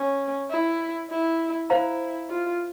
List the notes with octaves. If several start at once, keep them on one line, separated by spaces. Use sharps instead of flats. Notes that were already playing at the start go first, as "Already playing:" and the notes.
Already playing: C#4
E4
E4
E4 C5 F5 A#5
F4